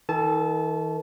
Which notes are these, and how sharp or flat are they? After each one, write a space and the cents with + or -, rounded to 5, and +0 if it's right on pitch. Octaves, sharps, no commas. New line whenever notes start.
E3 -45 A4 +20 A5 -25